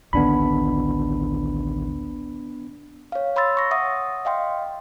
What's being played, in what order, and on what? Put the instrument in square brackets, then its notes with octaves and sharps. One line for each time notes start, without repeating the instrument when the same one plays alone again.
[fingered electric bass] A1 D2 D#3 [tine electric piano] B3 D4 B5
[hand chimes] C#5 F5
C#5 B5 C6 E6 A6
C#6 A#6
E5 F#5 D#6
D#5 F5 G5 C6